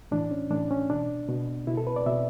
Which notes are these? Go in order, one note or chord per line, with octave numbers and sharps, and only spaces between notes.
A2 E3 D4
C#4
A2 E3 D4
C#4
B2 D4
B2
B2 E4
A4
B4
D5
B2 E5